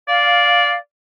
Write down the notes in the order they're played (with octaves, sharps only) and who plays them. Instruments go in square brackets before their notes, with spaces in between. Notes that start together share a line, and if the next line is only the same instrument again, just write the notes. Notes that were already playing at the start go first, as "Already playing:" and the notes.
[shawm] D5 [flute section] F5